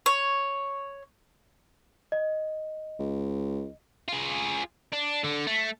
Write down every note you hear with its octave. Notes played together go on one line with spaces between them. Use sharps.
C#5
D#5
C#2
F4 G#4
D4
D3
A3